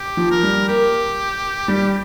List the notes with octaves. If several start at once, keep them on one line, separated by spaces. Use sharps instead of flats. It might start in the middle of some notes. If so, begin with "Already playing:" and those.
Already playing: G4
F3
A#4
G3
A#3 G4
G3